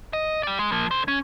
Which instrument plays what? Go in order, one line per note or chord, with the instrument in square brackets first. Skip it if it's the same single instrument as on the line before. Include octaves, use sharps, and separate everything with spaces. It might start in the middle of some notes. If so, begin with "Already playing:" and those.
[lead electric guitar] D#5
G4 D5
G#3
F3 A#3
D3 C5
C#4